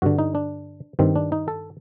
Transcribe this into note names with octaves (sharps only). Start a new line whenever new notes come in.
G2 D3 F#4
D#4
D4
G2 D#3 C4
D4
D#4
A4